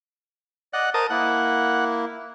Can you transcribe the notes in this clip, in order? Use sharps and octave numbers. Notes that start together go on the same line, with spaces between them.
D5 D#5 F#5
A#4 C5 D#5 A5 A#5 D#6
A#3 E4 F#5